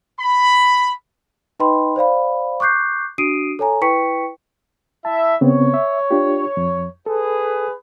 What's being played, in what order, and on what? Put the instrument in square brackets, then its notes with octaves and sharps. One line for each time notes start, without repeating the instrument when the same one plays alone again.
[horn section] B5
[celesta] D#4 B4 D#5 G5 B5 C6
C5 D5 F5 B5
C#6 D6 F#6 G6 C7
D4 F#4 D#6 C7 D7 D#7
A4 C#5 G#5 A#5
E4 B4 G5 C#6 B6 C#7
[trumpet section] E4 E5 [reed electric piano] A5
[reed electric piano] C#3 B3 C4 [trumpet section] C#5
[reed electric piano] E5
D4 F4 G4
F2
[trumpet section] G#4 B4 [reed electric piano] A4